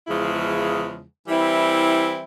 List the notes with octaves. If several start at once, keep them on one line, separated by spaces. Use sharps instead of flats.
E2 C#3 F3 G#3 E4
E3 G3 C4 E4